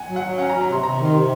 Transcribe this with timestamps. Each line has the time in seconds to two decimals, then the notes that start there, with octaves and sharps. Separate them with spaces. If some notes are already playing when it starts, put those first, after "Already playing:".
Already playing: F#5 G#5
0.09 F#3
0.16 F#5
0.23 F#3
0.38 C#4 F#5
0.49 A#5
0.53 F#3
0.61 A#5
0.69 C3 C6
0.83 C3 A#5
0.99 D#3
1.05 C6
1.14 C3